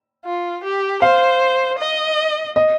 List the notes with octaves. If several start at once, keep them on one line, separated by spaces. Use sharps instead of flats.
F4
G4
C5 F5
D#5
D#5